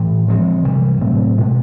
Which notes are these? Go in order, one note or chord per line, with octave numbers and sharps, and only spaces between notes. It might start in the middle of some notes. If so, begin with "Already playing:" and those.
Already playing: A2 E3 A3
F3 G#3 C4
C3 E3 G3
A2 F#3 A3 C4
B2 G#3 B3